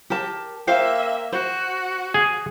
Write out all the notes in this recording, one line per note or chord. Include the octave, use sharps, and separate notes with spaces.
G4 A#4 A5
A#3 C5 E5 F5 G5
F#4 C5
G#4